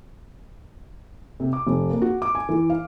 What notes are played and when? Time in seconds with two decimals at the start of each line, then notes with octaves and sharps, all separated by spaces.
1.40 C3
1.53 D6
1.67 F1
1.90 A#3
2.02 F#4
2.22 D6
2.35 G#5
2.49 E3
2.70 F5